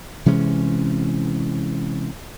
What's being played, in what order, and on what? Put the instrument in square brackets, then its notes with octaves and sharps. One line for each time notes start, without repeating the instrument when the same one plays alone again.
[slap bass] C3 E3 G#3 C#4